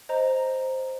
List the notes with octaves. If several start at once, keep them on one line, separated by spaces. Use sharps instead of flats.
C5 D#5 A#5